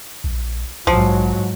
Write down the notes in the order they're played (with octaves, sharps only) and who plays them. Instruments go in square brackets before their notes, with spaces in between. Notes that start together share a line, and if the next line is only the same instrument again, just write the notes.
[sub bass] A#1
[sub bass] A#1 [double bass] G#2 F#3 [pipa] F3